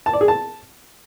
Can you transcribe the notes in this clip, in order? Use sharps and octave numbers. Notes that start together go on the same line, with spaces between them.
A5
D5
G#4
A5